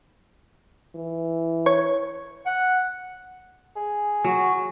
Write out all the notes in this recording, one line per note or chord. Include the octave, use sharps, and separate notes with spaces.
E3
C#5
F#5
G#4
F#3 F#4